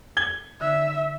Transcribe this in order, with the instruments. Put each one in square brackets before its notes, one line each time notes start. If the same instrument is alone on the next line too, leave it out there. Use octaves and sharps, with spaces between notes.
[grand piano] G#6 G7
[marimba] D3 D#4 [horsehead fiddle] E5